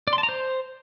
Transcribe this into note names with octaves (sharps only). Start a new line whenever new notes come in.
D5
C6
A5
A#5
C5